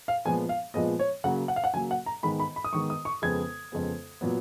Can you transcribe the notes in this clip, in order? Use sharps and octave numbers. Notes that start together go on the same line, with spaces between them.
F5
A#2 F3 G#3 B3 G#5
F5
A#2 F3 G#3 B3 D#5
C#5
C#3 F#3 A#3 F#5
F#5
F5
F#5
C#3 F#3 A#3 G#5
F#5
A#5
G#2 D#3 G#3 B3 B5
B5
B5
D#6
G#2 D#3 G#3 B3 C#6
D#6
C#6
F2 C#3 G#3 B3 G#6
F2 C#3 G#3 B3
A#2 F#3 B3